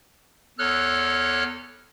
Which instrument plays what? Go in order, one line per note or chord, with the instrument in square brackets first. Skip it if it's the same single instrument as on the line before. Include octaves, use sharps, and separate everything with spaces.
[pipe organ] E2 A4 C#5 F6 F#6